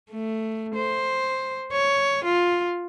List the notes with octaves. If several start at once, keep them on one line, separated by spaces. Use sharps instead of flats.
A3
C5
C#5
F4